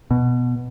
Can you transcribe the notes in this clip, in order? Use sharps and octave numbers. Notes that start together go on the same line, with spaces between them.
B2